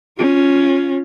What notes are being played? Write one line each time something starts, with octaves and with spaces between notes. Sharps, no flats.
C#4 F4